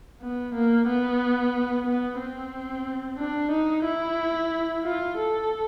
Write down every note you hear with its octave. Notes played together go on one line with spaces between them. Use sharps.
B3
A#3
B3
B3
C4
D4
D#4
E4
F4
A4